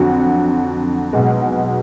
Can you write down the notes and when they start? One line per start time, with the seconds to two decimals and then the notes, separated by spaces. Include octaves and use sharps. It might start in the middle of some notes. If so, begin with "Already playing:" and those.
Already playing: F2 D3 F#3 F#4
1.13 B1 B2 G#3